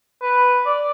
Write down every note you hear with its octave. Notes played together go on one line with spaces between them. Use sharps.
B4
D5